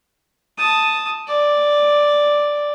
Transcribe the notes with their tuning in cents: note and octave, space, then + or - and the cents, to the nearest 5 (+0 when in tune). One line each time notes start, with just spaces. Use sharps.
A5 +0 D#6 +0
D5 +0 G5 +35